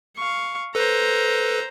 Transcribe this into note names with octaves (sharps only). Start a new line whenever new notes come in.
F5 C#6
A4 B4 C5 A#5